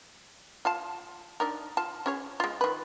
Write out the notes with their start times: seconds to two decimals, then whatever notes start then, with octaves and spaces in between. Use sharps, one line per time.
0.65 F4 F5 A5
1.40 D4 D#4 A#4
1.77 F4 A5
2.06 C#4 G#4 C#5
2.40 G#3 F4
2.61 D#3 B4